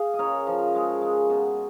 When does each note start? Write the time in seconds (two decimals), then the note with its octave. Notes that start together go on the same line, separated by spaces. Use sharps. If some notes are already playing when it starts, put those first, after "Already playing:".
Already playing: G#4 F5
0.14 D#5
0.19 C#3 A#4 C#5
0.47 F3
0.75 G#3
1.02 G#3
1.30 B2